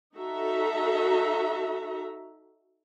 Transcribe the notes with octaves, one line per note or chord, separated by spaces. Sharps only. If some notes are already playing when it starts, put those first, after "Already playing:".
D#4 F#4 A4 E5 A#5